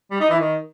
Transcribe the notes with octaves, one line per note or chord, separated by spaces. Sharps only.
G3
D#4
E3
D#3